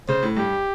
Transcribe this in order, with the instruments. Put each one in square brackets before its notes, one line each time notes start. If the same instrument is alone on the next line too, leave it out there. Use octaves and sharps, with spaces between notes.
[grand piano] C#3 [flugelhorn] C5
[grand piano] A2
[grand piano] G2 [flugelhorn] G4